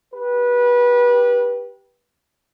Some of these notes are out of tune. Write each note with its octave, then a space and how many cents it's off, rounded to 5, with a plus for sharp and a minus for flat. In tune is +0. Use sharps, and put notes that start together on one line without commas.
G4 +0 B4 -25